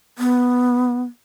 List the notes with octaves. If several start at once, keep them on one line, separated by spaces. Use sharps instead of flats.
B3